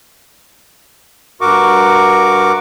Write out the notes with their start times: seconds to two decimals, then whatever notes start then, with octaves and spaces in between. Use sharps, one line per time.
1.41 G2 F#4 A#4 C#6 D6